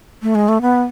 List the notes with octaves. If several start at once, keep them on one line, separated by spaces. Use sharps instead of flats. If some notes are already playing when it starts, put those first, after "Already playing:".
A3
G#3
A3
B3